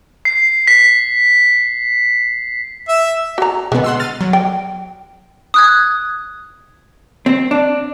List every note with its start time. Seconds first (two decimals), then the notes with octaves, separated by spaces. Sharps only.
0.25 C7
0.68 B6
2.88 E5
3.38 F#4 A#5
3.72 B2 D3 G#3 B3
3.84 F#5 C6 E6
4.00 F6 A6 D#7
4.21 F#3
4.33 G5
5.54 D#6 F#6 G#6
7.26 C4
7.51 D4